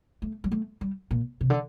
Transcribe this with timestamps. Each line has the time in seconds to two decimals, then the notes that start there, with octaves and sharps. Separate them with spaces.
0.22 A3
0.44 G3
0.52 A3
0.81 G3
1.11 A#2
1.41 C3
1.50 D3